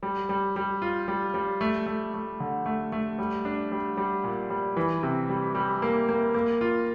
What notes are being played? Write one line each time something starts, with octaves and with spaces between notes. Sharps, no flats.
G3
G3
G3
F4
G3
G3
A3
A3
A3
D3
A3
A3
G3
D4
G3
G3
A#2
G3
E3
C3
G3
G3
A#3
A#3
A#3
F4